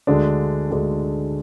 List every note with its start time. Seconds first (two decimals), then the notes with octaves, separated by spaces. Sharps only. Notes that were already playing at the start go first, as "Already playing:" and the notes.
0.07 D2 D3 G#3 D4
0.71 D2 D3 G#3 D4